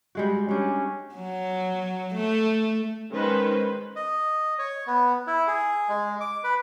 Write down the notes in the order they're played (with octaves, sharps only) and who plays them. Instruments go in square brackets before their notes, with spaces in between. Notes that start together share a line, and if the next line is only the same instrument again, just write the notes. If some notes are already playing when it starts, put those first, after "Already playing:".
[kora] G3 G#3 F#4
[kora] G3 D4 [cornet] C#4
[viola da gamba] F#3
A3
[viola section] D#3 G#3 C#4 B4 C5
[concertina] D#5
C#5
B3
E4
G#4
G#3
D6
B4